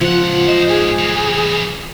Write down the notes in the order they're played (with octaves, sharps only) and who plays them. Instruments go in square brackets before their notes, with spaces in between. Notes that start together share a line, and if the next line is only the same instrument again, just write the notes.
[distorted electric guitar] C#2 F#5 [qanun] F3
[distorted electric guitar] E2 C5 [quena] D#5
[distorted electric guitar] G#2 [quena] G#4
[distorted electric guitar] E3 C4